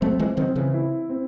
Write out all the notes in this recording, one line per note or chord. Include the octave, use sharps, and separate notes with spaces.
F#3 A3 C4
E3 G#3
D#3 F#3 C4
C#3 E3
E4
C4